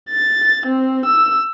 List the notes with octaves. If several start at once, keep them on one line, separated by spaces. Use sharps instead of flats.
A6
C4
E6